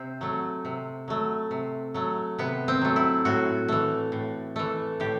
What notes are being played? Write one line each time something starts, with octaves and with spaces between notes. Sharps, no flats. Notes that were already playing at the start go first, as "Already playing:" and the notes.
Already playing: C3 C4
F#3 A3
C3
F#3 A3
C3
F#3 A3
C3 B3
C4
F#3 A3
E4
A2 F#4
E3 A3
A2
E3 A3
A2 G4